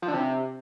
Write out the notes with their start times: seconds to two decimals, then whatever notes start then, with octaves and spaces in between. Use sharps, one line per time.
0.02 F3
0.08 D3
0.14 C3